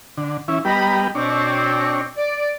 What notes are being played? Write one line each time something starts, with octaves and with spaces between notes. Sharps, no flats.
D3
E3 C#4 E4
G3 B3 G4 D#5 A#5 B5
B2 C4 D4 C#5
D5